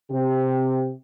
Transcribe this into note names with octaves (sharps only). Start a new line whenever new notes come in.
C3 G4